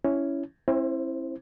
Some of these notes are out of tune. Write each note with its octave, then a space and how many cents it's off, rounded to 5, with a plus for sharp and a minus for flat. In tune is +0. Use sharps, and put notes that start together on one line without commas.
C#4 +0 E4 +0
C4 +45 E4 +0 C5 +0